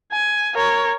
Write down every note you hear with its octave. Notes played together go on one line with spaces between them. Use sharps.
G#5
A#4 C#5